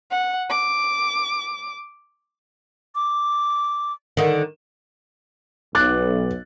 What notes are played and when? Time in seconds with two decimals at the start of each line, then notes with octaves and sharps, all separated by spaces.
0.11 F#5
0.50 D6
2.95 D6
4.17 D3 D#3
5.75 B1 D6 F#6 A6